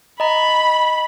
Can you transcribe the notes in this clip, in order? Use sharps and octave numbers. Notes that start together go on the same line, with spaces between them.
D#5 A#5 B5